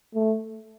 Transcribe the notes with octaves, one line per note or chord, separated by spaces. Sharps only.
A3